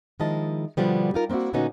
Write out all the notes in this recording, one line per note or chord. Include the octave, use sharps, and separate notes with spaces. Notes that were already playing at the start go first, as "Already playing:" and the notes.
D#3 F3 G#3 E4 D#5 A5
B2 D3 F3 G3 B3
D#4 F4 A#4
A#3 C4 D4 E4 F#4
A#2 D3 B3 C#4 D#4 F#4